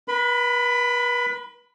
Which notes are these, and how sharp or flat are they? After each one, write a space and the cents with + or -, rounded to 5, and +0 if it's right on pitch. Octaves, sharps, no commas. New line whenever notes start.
B4 -35 B5 +20